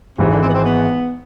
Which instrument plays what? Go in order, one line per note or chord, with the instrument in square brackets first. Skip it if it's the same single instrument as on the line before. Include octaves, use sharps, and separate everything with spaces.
[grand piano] G#1 G#2 E3 G#3 [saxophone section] C3
[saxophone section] D3
C4
B3
C4
B3